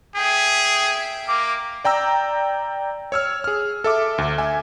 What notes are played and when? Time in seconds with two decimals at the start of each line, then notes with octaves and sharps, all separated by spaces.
0.16 G#4 E5 G5
1.28 A#3 D6
1.85 D5 G5 A#5 E6
3.12 C#5 E6 F6
3.44 G#4 F6
3.84 A4 E5 D6
4.18 D2
4.38 E5 G#5